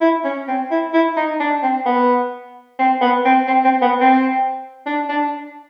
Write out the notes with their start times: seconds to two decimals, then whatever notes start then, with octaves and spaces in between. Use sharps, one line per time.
0.01 E4
0.24 C#4
0.48 C4
0.71 E4
0.93 E4
1.17 D#4
1.40 D4
1.62 C4
1.86 B3
2.79 C4
3.01 B3
3.25 C4
3.47 C4
3.64 C4
3.82 B3
4.00 C4
4.86 D4
5.09 D4